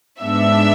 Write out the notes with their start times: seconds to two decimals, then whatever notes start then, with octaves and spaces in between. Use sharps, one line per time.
0.20 G#2 G#3 B3 D4 E5